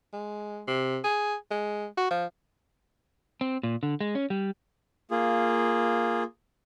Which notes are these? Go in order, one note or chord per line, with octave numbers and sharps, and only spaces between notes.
G#3
C3
G#4
G#3
F#4
F3
C4
A#2
D3
G#3
C#4
G3
A#3 F4 G#4